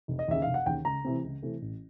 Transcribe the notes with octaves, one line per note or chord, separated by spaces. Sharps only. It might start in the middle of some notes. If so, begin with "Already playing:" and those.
F1
D#5
D#2 C#3 E5
F1 F5
F#5
D#2 C#3 G5
C#2 A#5
C3 E3 A3 C4
C#2
C3 E3 A3 C4
A1